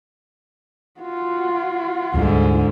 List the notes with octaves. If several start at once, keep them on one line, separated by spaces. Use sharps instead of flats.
F4 F#4
D2 G#2 D3 G3